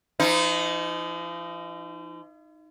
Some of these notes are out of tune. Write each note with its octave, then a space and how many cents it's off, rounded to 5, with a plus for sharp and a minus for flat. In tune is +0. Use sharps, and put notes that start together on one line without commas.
F3 -45 D#4 +0